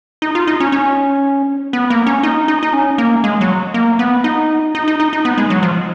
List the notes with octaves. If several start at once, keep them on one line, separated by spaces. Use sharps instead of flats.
D#4
F4
D#4
C#4
C#4
B3
A#3
C#4
D#4
D#4
D#4
C#4
A#3
G#3
F#3
A#3
B3
D#4
D#4
D#4
D#4
D#4
B3
G#3
F#3
F3